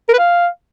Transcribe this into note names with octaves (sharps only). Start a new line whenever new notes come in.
A#4
B4
F5